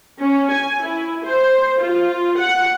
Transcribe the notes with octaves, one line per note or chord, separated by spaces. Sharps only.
C#4
G#5
E4
C5
F4
F#5